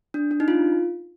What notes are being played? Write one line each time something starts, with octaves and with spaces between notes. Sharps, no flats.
D4
D4
D#4
F4